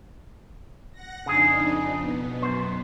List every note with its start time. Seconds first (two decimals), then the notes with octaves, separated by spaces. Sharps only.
0.92 F#5 A#6
1.26 F2 C#3 D4 D#4 G#4
1.99 B2 B3
2.42 F#2 C5